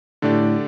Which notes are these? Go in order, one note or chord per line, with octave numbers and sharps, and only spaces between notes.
A2 D3 A3 D4 G4 D5